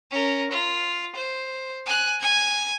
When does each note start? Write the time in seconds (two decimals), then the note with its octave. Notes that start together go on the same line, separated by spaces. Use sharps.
0.11 C#4 A#4
0.51 F4
1.15 C5
1.86 G#5 F#6
2.21 G#5 G#6